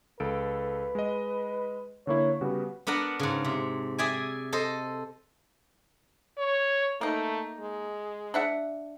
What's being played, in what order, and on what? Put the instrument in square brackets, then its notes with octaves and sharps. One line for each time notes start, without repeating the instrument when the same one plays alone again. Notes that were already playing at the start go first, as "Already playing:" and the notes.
[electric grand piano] C#2 A4 D7 [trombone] B4
[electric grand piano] G#3 D#5
[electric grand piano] D3 A#3 E4 [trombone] C#5
[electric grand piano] C#3 G3 F#4 [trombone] B3
[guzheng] B3 D4 A#4 F#5
G#2 C#3
C3
G#4 D5 E5 G5 G#5
A4 C5 D#5
[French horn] C#5
[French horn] A3 [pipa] A#3 D#4
[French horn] G#3
[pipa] D4 E5 F#5